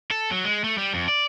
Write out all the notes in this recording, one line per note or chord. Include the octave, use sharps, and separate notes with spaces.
A4
F#3
G#3
A3
G3
F2
D5